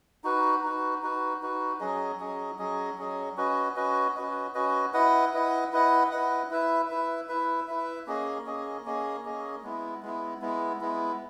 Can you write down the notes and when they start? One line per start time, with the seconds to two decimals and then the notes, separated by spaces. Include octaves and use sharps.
0.24 D#4 F#4 B4
0.63 D#4 F#4 B4
1.03 D#4 F#4 B4
1.42 D#4 F#4 B4
1.80 F#3 C#4 G#4 D#5
2.20 F#3 C#4 G#4 D#5
2.59 F#3 C#4 G#4 D#5
2.98 F#3 C#4 G#4 D#5
3.37 C#4 F#4 B4 D#5
3.76 C#4 F#4 B4 D#5
4.15 C#4 F#4 B4 D#5
4.54 C#4 F#4 B4 D#5
4.94 E4 B4 D#5 F#5
5.33 E4 B4 D#5 F#5
5.72 E4 B4 D#5 F#5
6.11 E4 B4 D#5 F#5
6.50 E4 B4 E5
6.89 E4 B4 E5
7.29 E4 B4 E5
7.68 E4 B4 E5
8.07 A#3 C#4 G#4 D#5
8.46 A#3 C#4 G#4 D#5
8.85 A#3 C#4 G#4 D#5
9.24 A#3 C#4 G#4 D#5
9.63 G#3 B3 E4
10.03 G#3 B3 E4
10.41 G#3 B3 E4
10.81 G#3 B3 E4